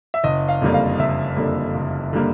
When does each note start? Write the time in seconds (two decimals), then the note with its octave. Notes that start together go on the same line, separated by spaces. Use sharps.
0.14 E5
0.24 F#1 D#5
0.49 F5
0.62 F2 D3 G3 A#3
0.74 F5
0.99 F#1 E5
1.36 F2 D3 G3 A#3
1.75 F#1
2.13 D3 G3 A#3